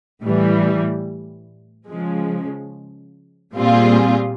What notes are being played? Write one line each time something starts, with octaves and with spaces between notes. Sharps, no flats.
A2 E3 G3
C#3 F3 G#3
A#2 G3 C4 F4 G#4